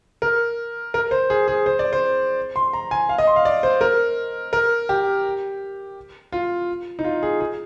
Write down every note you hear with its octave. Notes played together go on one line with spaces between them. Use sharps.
A#4
A#4
C5
G#4
G#4
C5
D5
C5
C6
A#5
G#5
F5
D#5
C6
F5
D5
C5
A#4
A#4
G4
F4
D#4
F4
G#4
G#4